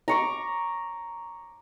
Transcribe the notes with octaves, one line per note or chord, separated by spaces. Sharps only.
A#5 C#6 D6